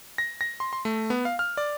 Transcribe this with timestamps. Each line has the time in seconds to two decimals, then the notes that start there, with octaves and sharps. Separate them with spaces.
0.18 A#6
0.41 A#6
0.60 C6
0.73 C6
0.85 A3
1.10 B3
1.25 F5
1.39 F6
1.57 D5